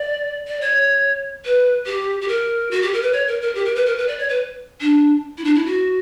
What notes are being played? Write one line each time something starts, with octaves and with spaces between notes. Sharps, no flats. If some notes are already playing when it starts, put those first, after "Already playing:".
Already playing: D5
D5
C#5
B4
G4
G4
A#4
F#4
G4
A#4
B4
C#5
A#4
A#4
G4
A#4
B4
A#4
B4
D5
C#5
B4
D4
E4
D4
E4
F#4